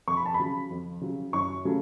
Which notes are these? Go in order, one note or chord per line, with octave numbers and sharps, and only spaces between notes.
F2 C#6
B5
A5
B5
C#3 F#3
F2
C#3 F#3
F#2 C#6
C#3 F#3 A3 C#4